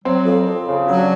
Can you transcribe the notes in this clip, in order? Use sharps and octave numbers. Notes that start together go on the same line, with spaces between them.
F#3 C4
F2
F2
C#3
F#3 C#4
D4